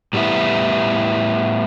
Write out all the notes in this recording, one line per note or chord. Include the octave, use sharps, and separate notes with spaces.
A2 G3 B3 E4